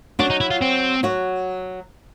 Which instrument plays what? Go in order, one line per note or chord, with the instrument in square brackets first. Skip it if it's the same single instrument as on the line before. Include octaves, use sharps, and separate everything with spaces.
[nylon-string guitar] F#3 F#4 [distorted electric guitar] D4
[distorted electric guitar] D#4
E4
F4
C4
[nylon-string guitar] F#3 F#4